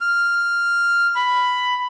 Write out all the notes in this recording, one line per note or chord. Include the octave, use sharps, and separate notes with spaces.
F6
B5